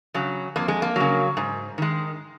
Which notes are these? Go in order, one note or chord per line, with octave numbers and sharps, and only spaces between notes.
C#3 F#3
F2 A#3
G#3
A#3
C#3 F#3
G#2
D#3 G#3